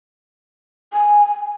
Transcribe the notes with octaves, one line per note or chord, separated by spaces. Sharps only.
G#5